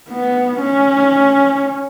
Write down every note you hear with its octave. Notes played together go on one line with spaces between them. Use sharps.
B3
C#4